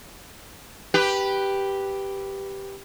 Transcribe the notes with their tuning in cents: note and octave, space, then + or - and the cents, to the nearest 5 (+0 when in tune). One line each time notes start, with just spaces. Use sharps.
G4 +0 B4 +0